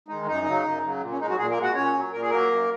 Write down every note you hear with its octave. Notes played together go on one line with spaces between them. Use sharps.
D#3 G#3 D#4
F#2 D#4
C#3 F#3
F#2
C#3 F#3
A#2
C#4
G#3 D#4
F#3 F#4
A#2 G#3 G#4
A#3 A#4
G#3
F#4 F#5
A#2 C#4 C#5
F#3
A#2 A#4
G#4
F#3 A#3 A#4
F#2